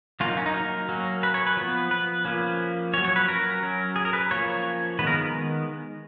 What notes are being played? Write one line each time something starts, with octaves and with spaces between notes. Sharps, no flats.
F#3 A#3 C#4 F4
D#4
C#4
D#4
A#4
F#3 A#3 C#4
B4
C#5
B4
F3 B3
B4
F3 A#3 C#4
F#3 C#4 C#5
C#5
B4
A#4
F#3 C#4
G#4
A#4
B4
F3 A#3 C#4 C#5
D#3 G#3 B3 B4
A#4